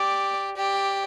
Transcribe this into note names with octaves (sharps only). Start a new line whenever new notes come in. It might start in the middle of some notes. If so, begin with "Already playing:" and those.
Already playing: G4 D5
G4 D5